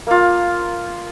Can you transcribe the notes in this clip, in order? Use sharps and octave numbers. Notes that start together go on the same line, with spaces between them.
A#3 F4